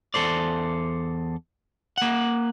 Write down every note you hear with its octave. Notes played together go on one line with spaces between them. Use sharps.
E2 A4 C5 D5
A#3 F#5